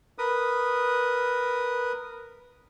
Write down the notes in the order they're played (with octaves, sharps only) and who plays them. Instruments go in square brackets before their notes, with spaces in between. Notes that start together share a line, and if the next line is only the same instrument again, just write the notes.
[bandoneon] A#4 B4 D#6